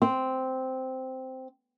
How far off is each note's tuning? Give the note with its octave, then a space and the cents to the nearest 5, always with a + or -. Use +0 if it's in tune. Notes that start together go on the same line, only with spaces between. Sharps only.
C4 -5